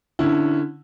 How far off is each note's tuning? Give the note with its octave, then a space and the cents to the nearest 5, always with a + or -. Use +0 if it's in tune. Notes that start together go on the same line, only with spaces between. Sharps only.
D3 +0 C#4 +0 E4 +0